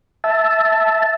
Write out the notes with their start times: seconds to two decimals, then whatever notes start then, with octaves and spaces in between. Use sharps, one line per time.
0.24 E5 A5